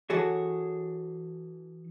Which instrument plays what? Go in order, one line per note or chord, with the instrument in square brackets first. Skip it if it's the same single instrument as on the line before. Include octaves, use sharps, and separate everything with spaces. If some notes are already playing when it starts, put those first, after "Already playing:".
[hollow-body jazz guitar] E3 F#4 G#4 A4 C#5